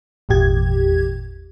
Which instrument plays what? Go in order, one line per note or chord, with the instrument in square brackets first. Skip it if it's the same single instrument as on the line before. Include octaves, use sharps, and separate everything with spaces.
[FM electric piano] G#1 E2 A#2 G4 G#6